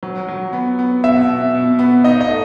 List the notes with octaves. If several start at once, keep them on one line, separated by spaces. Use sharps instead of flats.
F#3
F#3
B3
B3
B2 E5
B2
B2
B3
D#4 D#5
D#5
A3